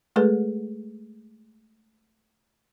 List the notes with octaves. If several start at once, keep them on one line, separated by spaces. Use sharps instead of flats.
G#3 A3 G#4 A4 B4